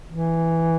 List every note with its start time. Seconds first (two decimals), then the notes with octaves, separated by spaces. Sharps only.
0.09 E3